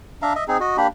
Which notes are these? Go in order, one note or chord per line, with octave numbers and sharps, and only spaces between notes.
D4 E5 F5 A#5
D#5 E5
C4 D#4 G#4
F#4 D#5
A#3 D4 G4 B5